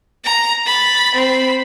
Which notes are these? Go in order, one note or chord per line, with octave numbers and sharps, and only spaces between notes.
A#5
B5 A6
C4 B5